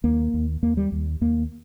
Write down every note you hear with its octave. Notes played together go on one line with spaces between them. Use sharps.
D#2 A#3
D#2
D#2 A#3
G3
D#2
D#2 A#3